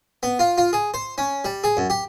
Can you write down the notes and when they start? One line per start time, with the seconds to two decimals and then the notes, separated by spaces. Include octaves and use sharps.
0.23 B3
0.39 F4
0.58 F4
0.73 G#4
0.94 C5
1.18 C#4
1.45 G3
1.64 G#4
1.77 F#2
1.90 G4